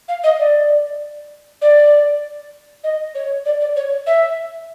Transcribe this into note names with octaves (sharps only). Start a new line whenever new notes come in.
F5
D#5
D5
D5
D#5
C#5
D5
D5
C#5
E5